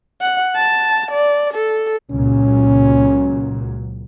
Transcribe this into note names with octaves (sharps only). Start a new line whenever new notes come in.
F#5
A5
D5
A4
C#2 A#2 F#3 C#4